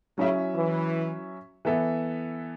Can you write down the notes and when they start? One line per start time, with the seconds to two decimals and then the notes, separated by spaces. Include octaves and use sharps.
0.18 C#3 F#3 C#4 E4 C#5 E5
0.55 E3
1.65 E3 B3 A4 E5